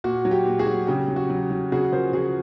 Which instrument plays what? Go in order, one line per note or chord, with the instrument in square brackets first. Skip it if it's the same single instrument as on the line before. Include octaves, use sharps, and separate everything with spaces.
[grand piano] A#2 F#4
F#3
G4
A#2
F#4 G#4
F#3
C#3 G4
F#3
F#4
F#3
F#3
C#3 F#4 G#4
F3 A#4 C5
F3 F#4 G#4